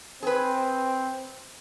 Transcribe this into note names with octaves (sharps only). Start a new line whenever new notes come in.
C4 G#4 B4